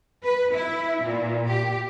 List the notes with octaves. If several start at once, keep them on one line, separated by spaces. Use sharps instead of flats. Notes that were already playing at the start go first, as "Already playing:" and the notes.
B4
E4
A#2
G4